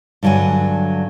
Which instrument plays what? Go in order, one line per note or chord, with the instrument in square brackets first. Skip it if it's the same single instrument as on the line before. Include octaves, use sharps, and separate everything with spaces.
[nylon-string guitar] G2 D3 F#3 F#4 G#5